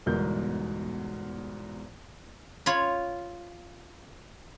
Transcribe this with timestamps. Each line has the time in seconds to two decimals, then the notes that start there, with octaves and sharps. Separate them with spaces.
0.06 G1 E2 G#2 B2 A#4 G6
2.66 F4 C#5 B5